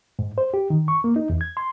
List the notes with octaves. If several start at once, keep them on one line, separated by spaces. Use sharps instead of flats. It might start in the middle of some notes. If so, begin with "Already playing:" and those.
G#2
C5
G4
D#3
C#6
A#3
D#4
E2
G#6
C6